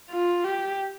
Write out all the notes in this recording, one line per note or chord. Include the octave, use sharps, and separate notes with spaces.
F4
G4